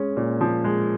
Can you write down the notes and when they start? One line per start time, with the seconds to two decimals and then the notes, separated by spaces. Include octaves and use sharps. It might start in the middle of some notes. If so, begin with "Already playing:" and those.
Already playing: G#3 C#4
0.17 A#2
0.41 F3
0.64 G#3